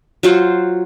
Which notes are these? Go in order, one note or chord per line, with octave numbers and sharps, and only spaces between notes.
F#3 F4 C5 F#5